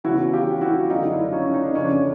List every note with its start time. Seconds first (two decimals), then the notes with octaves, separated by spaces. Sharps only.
0.04 E2 C#3 E3 E4 F#4
0.33 F4 G4
0.61 E4 F#4
0.90 F#2 D3 D#4 F4
1.11 D4 E4
1.32 C#4 D#4
1.54 D#4
1.64 D4
1.75 F2 C#3 E3 C#4
1.85 D4